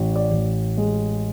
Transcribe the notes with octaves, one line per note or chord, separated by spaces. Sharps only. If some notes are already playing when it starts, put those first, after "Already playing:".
Already playing: A1
D5
A1
G#3